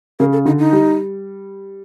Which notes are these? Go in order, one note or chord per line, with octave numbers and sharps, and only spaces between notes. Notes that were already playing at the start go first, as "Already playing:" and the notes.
C#3 A#4
A4
D3 D#4
D#4
G3